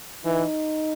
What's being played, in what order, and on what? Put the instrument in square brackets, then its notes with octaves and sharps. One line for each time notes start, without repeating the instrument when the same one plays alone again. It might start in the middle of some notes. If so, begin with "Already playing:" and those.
[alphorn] E3 [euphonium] D#4